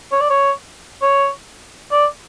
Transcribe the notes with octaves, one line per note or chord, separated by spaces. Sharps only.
C#5
D5
C#5
C#5
D5